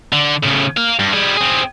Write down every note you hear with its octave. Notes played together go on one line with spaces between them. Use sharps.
D3
A2 C#3
A#4 F5
G2
G3 G#4
C4 G#4